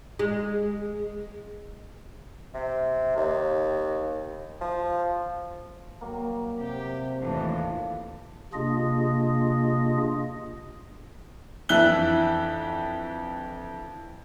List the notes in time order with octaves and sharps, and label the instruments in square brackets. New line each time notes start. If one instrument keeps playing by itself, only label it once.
[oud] G#3
[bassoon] C3
D#2
F3
[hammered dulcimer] F#3 G3 A#3
[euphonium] C3 [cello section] G4
[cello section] D#2 A2 E3 [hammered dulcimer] D4 F4 A4
[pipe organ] C3 A#3 D4 F4 G#4 D#5
[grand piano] F2 E3 D4 E5 F#6 G7